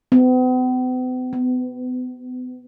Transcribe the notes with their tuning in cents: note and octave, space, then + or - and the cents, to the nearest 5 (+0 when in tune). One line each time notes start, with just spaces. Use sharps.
B3 +45
B3 +30